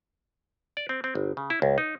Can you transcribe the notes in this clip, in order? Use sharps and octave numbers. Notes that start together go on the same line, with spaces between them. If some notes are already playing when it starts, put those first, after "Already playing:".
D5
C4
C4
G1
C#3
E4
C#2
D#4